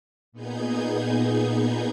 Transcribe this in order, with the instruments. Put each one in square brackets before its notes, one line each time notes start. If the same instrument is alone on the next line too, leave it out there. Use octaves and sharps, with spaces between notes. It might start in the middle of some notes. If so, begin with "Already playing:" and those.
[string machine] A#2 B3 D#4 G#4 G6 G#6